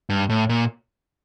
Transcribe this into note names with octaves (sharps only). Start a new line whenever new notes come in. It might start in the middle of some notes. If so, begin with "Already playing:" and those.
G2
A2
A#2